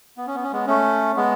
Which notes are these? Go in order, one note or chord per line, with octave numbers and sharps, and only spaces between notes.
B3
C#4
B3
C#4
G#3 B3
A3 C#4
G#3 B3